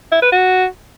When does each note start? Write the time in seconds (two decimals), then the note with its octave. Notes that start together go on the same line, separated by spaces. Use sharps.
0.12 E4
0.22 B4
0.32 F#4